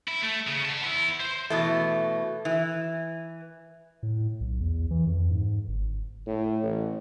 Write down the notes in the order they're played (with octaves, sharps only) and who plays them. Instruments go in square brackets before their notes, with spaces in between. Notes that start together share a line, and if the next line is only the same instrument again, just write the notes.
[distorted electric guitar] E4
A3
C#3
F#5 A5
B3 E4
C5
[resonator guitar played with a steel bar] B2 E3 A3
E3
[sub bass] A2
B1
E2
E3
F2
G#2
G1
[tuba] A2
A1